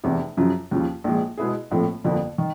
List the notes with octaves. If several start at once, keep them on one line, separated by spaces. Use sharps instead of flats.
F1 E2 C3
F#2 C#3 F3
D#2 C#3 F3
A#1 A#2 F3 G#3
B2 G#3 B3 E4 G#4
A#1 A2 F3 A3 C4
G1 F2 D3 F3 A#3
D#3